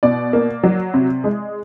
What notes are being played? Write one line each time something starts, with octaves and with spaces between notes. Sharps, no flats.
B2 D5
A#3
F#3
C3
G#3